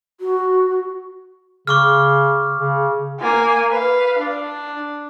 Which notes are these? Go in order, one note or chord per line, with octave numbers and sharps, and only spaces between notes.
F#4
C#3 C#6 D6 F6
C#3
A#3 G#5
B4 F5
D4